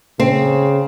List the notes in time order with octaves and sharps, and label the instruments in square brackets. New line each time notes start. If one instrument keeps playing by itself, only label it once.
[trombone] C#3 [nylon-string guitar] C4